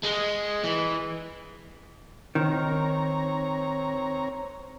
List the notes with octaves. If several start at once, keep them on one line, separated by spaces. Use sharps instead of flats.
G#3
E3
D#3 C4 C#5 A#5